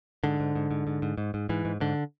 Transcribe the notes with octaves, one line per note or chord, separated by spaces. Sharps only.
G#2 D3
G#2
G#2
G#2
G#2
G#2
G#2
G#2
G#2 E3
G#2
G#2 D3